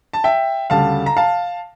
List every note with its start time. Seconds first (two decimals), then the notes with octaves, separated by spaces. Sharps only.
0.13 A5
0.24 E5 G5
0.70 D2 C#3 G3 F5 A5
1.06 A#5
1.17 F5 A5